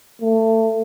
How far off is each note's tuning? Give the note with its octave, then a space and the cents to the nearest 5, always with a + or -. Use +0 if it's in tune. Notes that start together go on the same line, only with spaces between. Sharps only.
A3 +25